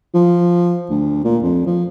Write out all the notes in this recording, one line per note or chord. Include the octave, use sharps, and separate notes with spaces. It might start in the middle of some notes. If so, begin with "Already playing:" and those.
F3
D2
A#2
F2
F3